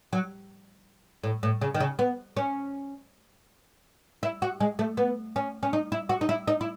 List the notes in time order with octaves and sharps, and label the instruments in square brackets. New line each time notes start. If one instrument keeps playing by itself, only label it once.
[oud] F#3
A2
A2
C#3
D#3
C#3
B3
C#4
E4
F#4
G#3
A3
B3
C#4
C#4
D#4
E4
F#4
D#4
E4
D#4
E4